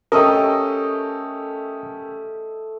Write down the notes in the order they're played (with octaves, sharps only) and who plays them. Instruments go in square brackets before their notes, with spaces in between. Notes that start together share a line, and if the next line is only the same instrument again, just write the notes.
[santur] A3 A4 D#5 [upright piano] C#4 G4 [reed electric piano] A#4 D#6